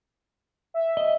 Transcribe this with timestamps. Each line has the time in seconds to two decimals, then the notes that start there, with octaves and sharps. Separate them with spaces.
0.74 E5
0.97 D#5